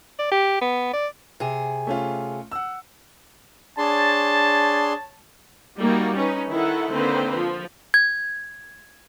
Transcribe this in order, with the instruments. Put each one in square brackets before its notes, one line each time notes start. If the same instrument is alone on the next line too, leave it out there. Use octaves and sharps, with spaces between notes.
[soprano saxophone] D5
G4
B3
D5
[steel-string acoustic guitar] C3 G#4
[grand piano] A3 C#4 F4
F#5 E6
[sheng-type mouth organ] D4 G#4 C6 [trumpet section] C#5 A5
[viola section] G3 A#3 D#4 F#4
C#4 D#4 B4
D#3 E4 A4 F#5
D3 D#3 A#3 C4 B4 C5
F3
[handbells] G#6